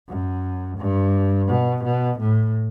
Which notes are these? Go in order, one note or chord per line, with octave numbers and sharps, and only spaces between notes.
F#2
G2
B2
B2
A2